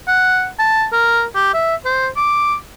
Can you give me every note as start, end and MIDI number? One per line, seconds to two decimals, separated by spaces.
0.08 0.48 78
0.59 0.86 81
0.93 1.24 70
1.35 1.51 67
1.54 1.75 76
1.85 2.08 72
2.17 2.55 86